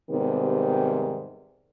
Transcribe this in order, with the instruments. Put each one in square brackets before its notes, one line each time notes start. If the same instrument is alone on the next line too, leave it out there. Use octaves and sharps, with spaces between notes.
[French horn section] G#2 C3 D#3 G3 B3